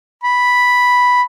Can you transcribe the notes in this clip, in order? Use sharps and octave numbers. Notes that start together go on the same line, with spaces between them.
B5